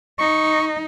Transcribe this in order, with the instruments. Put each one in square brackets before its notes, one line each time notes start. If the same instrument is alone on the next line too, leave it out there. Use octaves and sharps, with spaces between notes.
[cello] D#4 [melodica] C#6